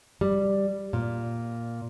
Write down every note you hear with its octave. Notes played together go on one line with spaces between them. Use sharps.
G3
A#2